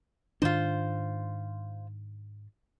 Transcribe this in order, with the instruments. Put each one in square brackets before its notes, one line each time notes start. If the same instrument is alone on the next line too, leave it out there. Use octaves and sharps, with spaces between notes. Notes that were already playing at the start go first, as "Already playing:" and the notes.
[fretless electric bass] G#2 D#3 D4 [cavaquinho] F4 C5